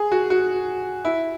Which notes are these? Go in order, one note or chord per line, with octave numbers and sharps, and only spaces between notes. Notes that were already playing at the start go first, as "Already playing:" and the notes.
Already playing: G#4
F#4
F#4
E4